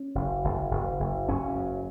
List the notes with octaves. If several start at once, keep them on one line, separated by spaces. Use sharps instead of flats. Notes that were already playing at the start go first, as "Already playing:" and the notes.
Already playing: C#4
F#1
F#1
F#1
F#1
F#1 C#4
F#2